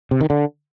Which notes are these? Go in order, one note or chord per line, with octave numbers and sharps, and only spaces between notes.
C3
D#3
D3